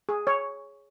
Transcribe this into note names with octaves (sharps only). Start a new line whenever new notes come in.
G#4
C#5